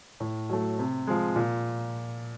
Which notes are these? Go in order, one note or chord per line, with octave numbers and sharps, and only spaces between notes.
A2
F#3 A3
C3
F3 G#3
A#2